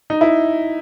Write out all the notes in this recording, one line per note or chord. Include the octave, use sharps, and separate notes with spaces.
D#4
E4